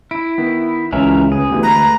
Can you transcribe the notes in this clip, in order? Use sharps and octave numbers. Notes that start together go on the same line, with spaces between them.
E4 D7
D#3 B3
C#2 E3 C#4 A#4 E5
C#3 G#4 B4
D2 E3 B3 G4
G#3 A3 B4 A#5